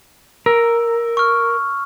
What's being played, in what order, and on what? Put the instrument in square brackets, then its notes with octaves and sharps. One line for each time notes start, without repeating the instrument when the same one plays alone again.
[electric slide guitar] A#4 [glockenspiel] E6
[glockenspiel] C#6 F6